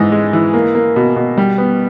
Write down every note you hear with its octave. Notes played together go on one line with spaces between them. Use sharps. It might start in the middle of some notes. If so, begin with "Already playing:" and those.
Already playing: G#2 E3 D#5
G#3
E3
A#3
A#3
B2
B2
G3
B3